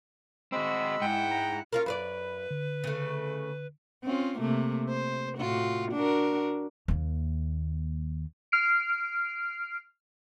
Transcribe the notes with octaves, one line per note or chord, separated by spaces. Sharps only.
G#3 C4 F#4 B5 E6
G#2 E4 F#5 G5
A#5
C#4 F4 A#4
F#2 G#4 B4 D5 B5
D3
C#3 A3
C4 C#4 F4
C3 A3 A#3
C5
A2 F4 F#4
D4 F#4 A#4
D#2 A#3
F6 C7 D7